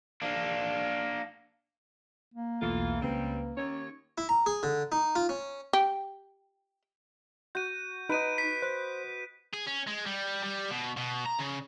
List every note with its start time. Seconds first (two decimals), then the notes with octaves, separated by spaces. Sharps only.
0.22 A#3 D4
2.34 A#3
2.62 B1 E2 E3 A3 F4
3.01 C#2 C#3 G3 C4 B4
3.57 D#2 C#4 C#5
4.18 E4
4.29 A#5
4.46 G#4
4.63 D3
4.92 D#4
5.15 F4
5.29 C#4
5.73 G4
7.55 F#4 G6 D#7
8.09 D#4 B4 D#5 D7 D#7
8.38 B6
8.62 C5 F#6 B6
9.53 G#4
9.67 C#4
9.87 G#3
10.06 G3
10.43 G3
10.71 B2
10.97 B2
11.25 A#5
11.39 C#3